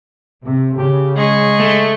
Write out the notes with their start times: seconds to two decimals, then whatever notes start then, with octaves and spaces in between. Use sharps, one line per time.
0.45 C3
0.77 C#3 G4
1.16 G#3 G#4 C#6
1.60 A3